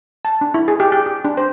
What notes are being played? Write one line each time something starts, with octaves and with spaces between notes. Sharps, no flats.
A5
D4
E4
G#4
G4
G4
G4
D4
C5